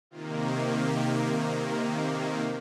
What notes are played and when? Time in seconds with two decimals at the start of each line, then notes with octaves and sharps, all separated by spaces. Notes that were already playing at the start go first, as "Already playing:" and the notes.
0.10 C3 D#3 A#3 F4
0.40 G4
0.69 G4
1.84 G4 A#4
2.12 A4 C5